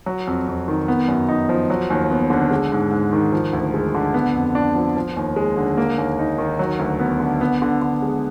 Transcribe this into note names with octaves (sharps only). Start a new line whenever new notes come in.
F#3
F2
F2
D#3
B3
F#2
D#4
F3
F#3
D#2
B3
D3
G#3
G#2
G#2
D#3
F3
D2
G#3
D3
B3
F2
D4
F3
F3
D#2
G#3
D3
A#3
D#2
D#4
D#3
F#3
D2
B3
D3
B3
D3
D3
G#3